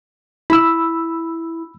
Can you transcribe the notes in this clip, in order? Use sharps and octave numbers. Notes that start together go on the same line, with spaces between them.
E4 B5 E6